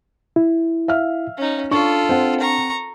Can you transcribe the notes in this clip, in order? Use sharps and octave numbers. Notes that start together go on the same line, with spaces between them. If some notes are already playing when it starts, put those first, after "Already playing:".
E4
E5 F5 F6
C#4 D#4
D4 F4 A4 C#6
C4 C5 F#5
A#5 C#6